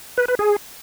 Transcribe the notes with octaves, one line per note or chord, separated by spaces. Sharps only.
B4
B4
G#4